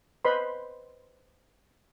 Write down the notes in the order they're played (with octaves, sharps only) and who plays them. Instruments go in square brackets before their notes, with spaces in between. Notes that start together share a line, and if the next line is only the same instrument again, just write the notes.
[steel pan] B4 C5 D#5 B5 C6